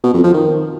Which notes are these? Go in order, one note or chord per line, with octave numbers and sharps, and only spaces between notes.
B2
F2
F3
D#3